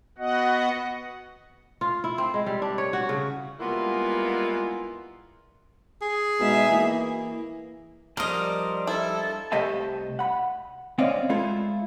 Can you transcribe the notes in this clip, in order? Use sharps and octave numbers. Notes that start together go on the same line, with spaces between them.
B3 F#4 D#5 F#5
F4
E4
C4
G#3
G3
D4
C#5
F#4
C#3
G3 G#3 A#3 B3 E4 F4
G#4
B2 G#3 D#4 E5
E3 A#3
F3 G3 D4 A#4 D#5
E4 A4
C2 A3 G4 D#5 E5 A5
F#5 B5
C4 C#4 D5 D#5 F5
G#3 A3 E4 F4 A4